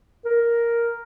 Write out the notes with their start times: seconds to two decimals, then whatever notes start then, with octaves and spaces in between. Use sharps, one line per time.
0.25 A#4